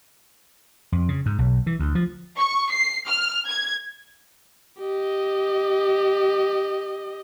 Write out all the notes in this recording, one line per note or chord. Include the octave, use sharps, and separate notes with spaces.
F2
C#3
G#2
B1
E3
D2
F3
C#6
C7
F6
G#6
G4 D#5